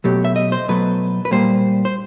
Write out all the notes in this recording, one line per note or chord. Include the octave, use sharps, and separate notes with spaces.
B2 F#3 A3 G4
E5
D#5
C5
B2 F#3 A3 B4
B4
A#2 G3 A#3 C5
C5